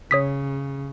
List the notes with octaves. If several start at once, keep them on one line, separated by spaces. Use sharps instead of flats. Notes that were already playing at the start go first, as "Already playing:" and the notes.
C#3 C#5 D#6 B6